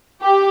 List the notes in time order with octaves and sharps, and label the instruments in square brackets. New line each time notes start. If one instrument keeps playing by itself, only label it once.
[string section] G4